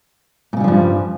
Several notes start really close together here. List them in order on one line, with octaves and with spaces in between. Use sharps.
A#2 C#3 G3 F3 G2